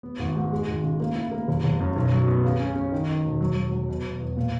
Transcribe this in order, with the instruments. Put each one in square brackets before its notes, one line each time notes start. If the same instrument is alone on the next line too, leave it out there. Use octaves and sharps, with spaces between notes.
[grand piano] B3
G#1
G#2
G#3
G#1
C#3
A#3
E4
A#3
F#1
F#1
F#2
B1
F#3
B3
C#3
C#4
C#4
D#3
D#3
E1
F#3
F#3
F#3
B2
B2
E2
A#2